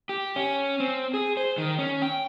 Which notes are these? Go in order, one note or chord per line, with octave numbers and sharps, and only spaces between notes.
G4
C#4
C4
G#4
C5
D#3
C#4
G5